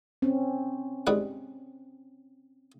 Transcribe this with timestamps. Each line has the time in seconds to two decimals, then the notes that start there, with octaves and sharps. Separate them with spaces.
0.22 C4 C#4
1.07 G#2 G3 F#5